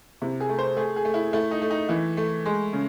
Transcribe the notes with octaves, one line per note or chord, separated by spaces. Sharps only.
C3 E4
G#4
A3
C5
A3 G#4
G#4
A3
E4
A3 E4
D#4
A3
D#4
E3 E4
A3
G#3
C#3